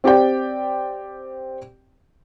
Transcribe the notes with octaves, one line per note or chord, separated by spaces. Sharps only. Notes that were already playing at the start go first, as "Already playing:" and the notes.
C4 G4 D5 G5